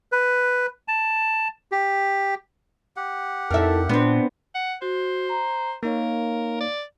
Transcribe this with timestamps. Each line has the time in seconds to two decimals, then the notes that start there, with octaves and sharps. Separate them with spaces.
0.12 B4
0.88 A5
1.72 G4
2.97 G4 F#5
3.51 F2 D#4 E4 A4 A#4 E5
3.89 A#2 B3 C4 D4
4.55 F#5
4.82 F#4 C5
5.29 A#5
5.83 A#3 D#4 A#4 C#5 F5
6.61 D5